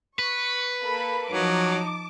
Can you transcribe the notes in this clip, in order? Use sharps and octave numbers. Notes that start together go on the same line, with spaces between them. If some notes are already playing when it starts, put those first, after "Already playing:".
B4 C#6
A#3 A4 B5
F3 F#3 D#4 A5 D6